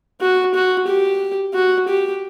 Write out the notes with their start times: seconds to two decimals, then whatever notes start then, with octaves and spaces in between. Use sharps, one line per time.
0.21 F#4
0.54 F#4
0.88 G4
1.54 F#4
1.88 G4